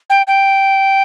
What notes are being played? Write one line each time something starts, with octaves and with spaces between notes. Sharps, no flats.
G5
G5